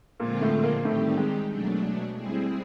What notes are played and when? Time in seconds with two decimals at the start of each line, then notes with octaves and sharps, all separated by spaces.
0.20 A#2 D3 F3 G#3 A#3 C4 F4
0.41 A2 A3
0.63 A#2 A#3
0.85 A2 D#3 G3 A3 C4 D#4 G4
1.17 G#3
1.50 B2 F#3 A3 D4
2.15 G3 C4 E4 G#4